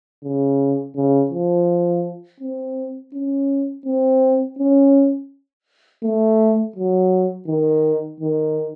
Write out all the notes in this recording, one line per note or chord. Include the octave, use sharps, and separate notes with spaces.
C#3
C#3
F3
C4
C#4
C4
C#4
A3
F#3
D#3
D#3